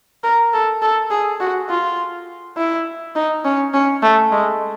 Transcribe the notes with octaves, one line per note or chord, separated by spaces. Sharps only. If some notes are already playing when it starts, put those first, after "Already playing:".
A#4
A4
A4
G#4
F#4
F4
E4
D#4
C#4
C#4
A3
G#3